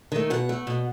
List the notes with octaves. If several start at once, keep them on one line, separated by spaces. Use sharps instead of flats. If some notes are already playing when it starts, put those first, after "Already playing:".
D#3 A3
B2 F#5
A3
B2